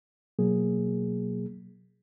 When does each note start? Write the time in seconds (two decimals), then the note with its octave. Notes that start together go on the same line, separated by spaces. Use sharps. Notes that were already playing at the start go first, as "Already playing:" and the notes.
0.39 B2 F#3 A#3 G#4